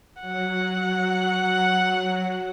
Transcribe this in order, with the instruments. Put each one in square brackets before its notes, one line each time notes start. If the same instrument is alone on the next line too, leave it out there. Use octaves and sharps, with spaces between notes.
[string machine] F#3 [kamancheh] F#5